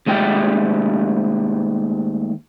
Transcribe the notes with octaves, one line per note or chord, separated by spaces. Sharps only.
D#2 G#3 A3 G4 G5